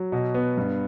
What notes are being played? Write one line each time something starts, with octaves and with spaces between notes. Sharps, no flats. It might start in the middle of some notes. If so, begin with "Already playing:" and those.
Already playing: F#3
B2
B3
G2